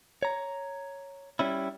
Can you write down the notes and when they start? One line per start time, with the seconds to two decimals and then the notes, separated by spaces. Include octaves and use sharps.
0.23 C#5 A#5
1.39 G3 C#4 E4